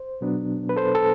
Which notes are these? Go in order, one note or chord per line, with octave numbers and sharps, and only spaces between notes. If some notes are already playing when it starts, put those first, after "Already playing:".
Already playing: C5
B2 F#3 B3 D4
B4
A4 C5
A4